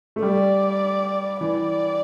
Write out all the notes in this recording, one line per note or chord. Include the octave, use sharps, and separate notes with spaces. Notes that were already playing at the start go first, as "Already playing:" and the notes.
A3
G3 D5
E3 D5